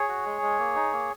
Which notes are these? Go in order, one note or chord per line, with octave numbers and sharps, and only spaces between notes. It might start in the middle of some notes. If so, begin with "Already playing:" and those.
Already playing: G#4 C#5
F#4
G#3
G#3
A#3
D#4
A#3